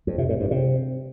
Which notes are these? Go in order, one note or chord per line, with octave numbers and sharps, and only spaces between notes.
F2
C3
A2
G2
C3